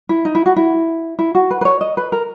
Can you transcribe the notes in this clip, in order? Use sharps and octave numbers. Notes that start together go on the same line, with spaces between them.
E4
D#4
E4
F#4
E4
E4
F#4
B4
B4
C#5
D#5
B4
A#4